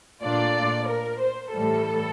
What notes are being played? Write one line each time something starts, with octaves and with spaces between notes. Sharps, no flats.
A#2 A3 D4 F4 D5
A#4
C5
A2 E3 G3 A4